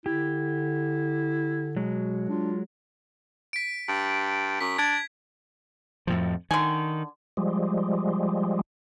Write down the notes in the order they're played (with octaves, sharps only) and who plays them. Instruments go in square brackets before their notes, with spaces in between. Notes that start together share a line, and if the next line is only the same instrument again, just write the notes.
[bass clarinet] D3 [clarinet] E4 [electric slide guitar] G4
[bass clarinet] B2 [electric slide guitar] F#3 G#3
[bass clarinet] D4 [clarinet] F4
[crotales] B6 D7
[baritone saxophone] G2
[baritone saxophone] F#2 [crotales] B6
[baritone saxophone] D4 [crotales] G#6
[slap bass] F2 A2 F3
[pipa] D3 G#5 [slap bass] D#3
[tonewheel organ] F3 G3 G#3